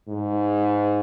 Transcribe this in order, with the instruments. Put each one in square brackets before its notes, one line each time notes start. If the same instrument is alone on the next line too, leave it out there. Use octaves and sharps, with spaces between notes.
[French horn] G#2